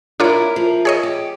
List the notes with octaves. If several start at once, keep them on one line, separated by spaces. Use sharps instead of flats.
D4 E4 F4 A#4 C#5
F3 A#4
G#4 C#5 D#5
G4